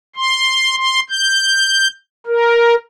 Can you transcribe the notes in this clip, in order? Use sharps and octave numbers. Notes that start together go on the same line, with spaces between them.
C6
C6
G6
A#4